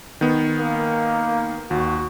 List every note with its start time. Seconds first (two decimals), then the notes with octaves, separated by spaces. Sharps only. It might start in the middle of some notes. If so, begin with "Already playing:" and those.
0.21 D#3 B3
0.59 A#3
1.71 D#2 F#4